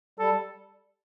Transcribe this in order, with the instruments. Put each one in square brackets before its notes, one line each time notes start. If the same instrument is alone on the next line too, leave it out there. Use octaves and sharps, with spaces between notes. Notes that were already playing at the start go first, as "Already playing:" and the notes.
[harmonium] G3 [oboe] A4